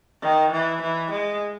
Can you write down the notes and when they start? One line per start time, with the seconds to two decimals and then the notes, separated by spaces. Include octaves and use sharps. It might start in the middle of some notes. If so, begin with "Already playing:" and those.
0.22 D#3
0.51 E3
0.82 E3
1.11 G#3